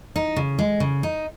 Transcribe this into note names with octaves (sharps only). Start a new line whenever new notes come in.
D#4
C#3
G#3
C#3
D#4